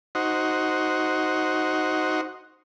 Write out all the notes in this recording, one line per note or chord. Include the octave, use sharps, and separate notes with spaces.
D#4 F#4 C5